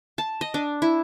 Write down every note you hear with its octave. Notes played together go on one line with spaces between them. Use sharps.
A5
D#5
D4
E4